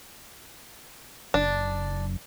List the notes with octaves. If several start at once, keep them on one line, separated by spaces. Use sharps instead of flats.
F#1 D4